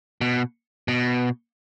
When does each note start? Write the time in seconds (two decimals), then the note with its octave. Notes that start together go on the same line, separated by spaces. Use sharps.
0.21 B2
0.88 B2